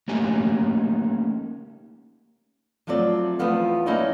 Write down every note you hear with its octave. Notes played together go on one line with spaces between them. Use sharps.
A3 A#3 C#4 D#4 G4 G#5
F3 F#3 A3 C4 D5
E2 F3 A3 B3 F5
A#3 C#4 D#4 E4 D5